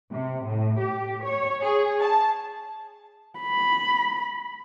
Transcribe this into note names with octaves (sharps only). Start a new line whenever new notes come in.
C3
A2
G4
C#5
G#4
A5
B5